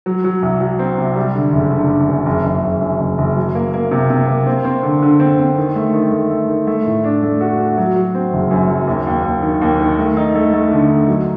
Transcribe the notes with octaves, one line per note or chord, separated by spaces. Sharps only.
F#3
F#3
C2
F#3
C4
C3
G3
D3
F#1
D3
D3
F#2
F#1
F#1
F#1
F#2
F#1
F#1
F#3
A#3
A#3
C3
C3
A#3
C4
C4
D3
D3
C4
C4
D#3
A3
D#3
A3
A3
D#3
A3
A2
D4
A3
F#4
F#4
F#3
F#3
C4
F#1
F#2
F#3
D#2
D#2
D#2
D#3
D#2
D#3
A3
D#4
A3
A3
D3
D#4
F#3